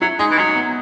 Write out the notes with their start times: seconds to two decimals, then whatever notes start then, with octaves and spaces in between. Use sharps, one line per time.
0.02 F#3 E4
0.19 G#3 D#4
0.31 E3
0.38 F#3 D#4
0.55 B3